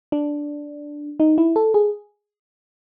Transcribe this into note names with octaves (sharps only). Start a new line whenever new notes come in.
D4
D#4
E4
A4
G#4